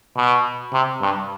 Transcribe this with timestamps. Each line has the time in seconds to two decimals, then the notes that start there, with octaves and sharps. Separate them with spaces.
0.17 B2
0.73 C3
1.01 G2